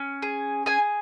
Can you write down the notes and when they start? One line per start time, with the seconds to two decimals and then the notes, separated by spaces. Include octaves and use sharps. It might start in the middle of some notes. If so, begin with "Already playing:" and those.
Already playing: C#4
0.22 G#4
0.66 G#4 G#5